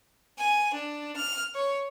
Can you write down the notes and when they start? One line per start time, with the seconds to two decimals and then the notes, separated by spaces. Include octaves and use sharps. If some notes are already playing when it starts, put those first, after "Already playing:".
0.38 G#5
0.73 D4
1.16 F6
1.54 C#5